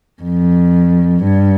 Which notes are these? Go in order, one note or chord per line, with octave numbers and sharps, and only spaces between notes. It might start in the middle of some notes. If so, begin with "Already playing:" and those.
F2
G2